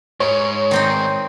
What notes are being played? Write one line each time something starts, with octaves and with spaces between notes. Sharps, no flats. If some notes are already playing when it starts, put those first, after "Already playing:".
G#2 C#5
D#3 C4 D#4